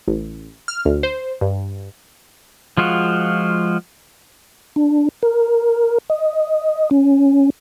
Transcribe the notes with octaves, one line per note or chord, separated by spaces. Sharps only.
A1
F6
D2
C5
G2
F3 G#3 F4 F#4
D4
A#4
D#5
C#4